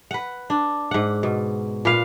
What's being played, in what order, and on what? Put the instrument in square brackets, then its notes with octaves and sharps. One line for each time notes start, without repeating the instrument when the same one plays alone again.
[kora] B4 F#5
D4
G#2 F#5
B2
A#2 B4 F5